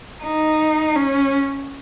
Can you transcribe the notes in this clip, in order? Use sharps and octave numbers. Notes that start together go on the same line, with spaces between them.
D#4
C#4